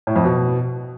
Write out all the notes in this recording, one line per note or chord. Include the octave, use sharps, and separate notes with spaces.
A2
F2
B2